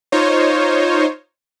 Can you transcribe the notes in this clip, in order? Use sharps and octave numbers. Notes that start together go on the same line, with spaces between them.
D#4 F4 C5 C#5